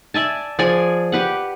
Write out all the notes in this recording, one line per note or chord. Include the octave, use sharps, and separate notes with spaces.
D5 E5 G#5 A5
F3 G#4 D5 G#5
G4 B4 F#5